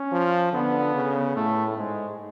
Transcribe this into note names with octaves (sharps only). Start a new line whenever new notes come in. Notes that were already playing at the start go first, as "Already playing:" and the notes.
Already playing: C#4
F3
D3 B3
C#3
A2 A3
G#2 G#3